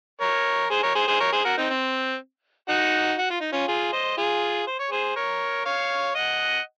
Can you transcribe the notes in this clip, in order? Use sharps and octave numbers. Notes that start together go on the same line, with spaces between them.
A#4 C#5
G#4 C5
A#4 C#5
G#4 C5
G#4 C5
A#4 C#5
G#4 C5
F#4 A#4
C4 D#4
C4
D#4 F#4
F#4
F4
D#4
C#4 F4
F4 G#4
C5 D#5
F4 G#4
C5
C#5
G#4 C5
A#4 C#5
C#5 F5
D#5 F#5